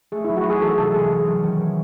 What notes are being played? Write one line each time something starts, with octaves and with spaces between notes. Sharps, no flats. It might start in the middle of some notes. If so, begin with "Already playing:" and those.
A3 G#4
E4
F#3
F#4
D#4 G#4
E3 A4
C3 A4
G#3 G#4
C#4
F#3
D#3
E3